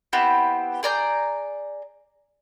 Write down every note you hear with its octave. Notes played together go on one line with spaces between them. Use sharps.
B3 C4 E4 G4
G#4 D5 A#5 G6